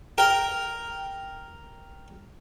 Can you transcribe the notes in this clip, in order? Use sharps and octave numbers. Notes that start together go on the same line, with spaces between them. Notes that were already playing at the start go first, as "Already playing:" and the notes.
A#4 G5